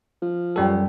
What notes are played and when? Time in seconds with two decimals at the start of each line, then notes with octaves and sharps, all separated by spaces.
0.22 F3
0.56 F#2 G3 G4 A4